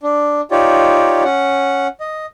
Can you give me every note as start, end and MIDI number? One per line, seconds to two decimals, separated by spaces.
0.03 0.41 62
0.51 1.23 63
0.51 1.23 65
0.51 1.23 67
0.51 1.23 73
0.51 1.23 74
1.24 1.87 61
1.24 1.87 78
2.00 2.26 75